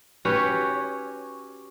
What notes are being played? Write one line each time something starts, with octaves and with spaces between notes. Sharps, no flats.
C#4 F#4 G4 B4 C#5